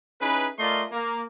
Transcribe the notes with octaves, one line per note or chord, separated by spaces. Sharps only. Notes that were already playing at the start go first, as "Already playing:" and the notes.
C#4 D#4 E4 G#4 B4
A3 F4 A#4 D5 D#5 C6
A#3